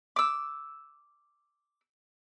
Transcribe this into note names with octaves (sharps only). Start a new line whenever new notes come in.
D6 E6